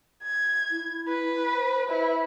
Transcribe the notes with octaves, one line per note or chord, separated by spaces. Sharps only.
G#6
E4
B4
C5
E4 B4